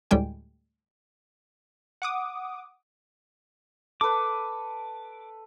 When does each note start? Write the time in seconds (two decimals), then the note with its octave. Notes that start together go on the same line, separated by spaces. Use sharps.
0.11 D2 A2 G3 G#3 G5 G#5
2.02 F#5 D6 D#6
4.01 A4 B4 D6